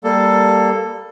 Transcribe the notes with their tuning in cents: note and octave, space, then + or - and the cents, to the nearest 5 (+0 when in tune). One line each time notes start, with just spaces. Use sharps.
G3 +0 A#3 +0 A4 +10